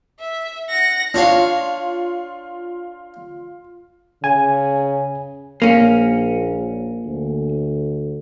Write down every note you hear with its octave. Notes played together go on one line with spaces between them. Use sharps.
E5
F#5 A#6
D4 F4 C#5 F5
C#3 G#5
A#1 A#3 C#4
D2